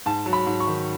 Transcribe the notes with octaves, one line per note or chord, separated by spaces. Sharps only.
G#2 A5
F#3
B5
G#2
C#6
D#3